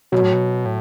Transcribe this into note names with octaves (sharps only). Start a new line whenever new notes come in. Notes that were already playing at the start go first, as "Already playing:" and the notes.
B2 F#3
A2
B2
A2